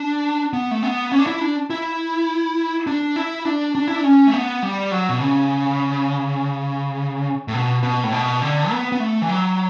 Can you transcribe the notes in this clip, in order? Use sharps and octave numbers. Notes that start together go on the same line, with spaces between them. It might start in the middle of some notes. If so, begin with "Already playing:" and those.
Already playing: D4
B3
A3
B3
C#4
D4
E4
D4
E4
D4
E4
D4
D4
E4
D4
C#4
A3
B3
G3
F#3
B2
C#3
A2
B2
B2
A2
B2
D3
B3
B3
A3
E3
F#3